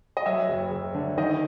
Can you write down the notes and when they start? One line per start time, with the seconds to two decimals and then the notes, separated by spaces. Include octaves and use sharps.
0.17 D#5
0.26 F#3 E5
0.49 F#1
0.71 F#1
0.95 D3
1.17 D#3 D#5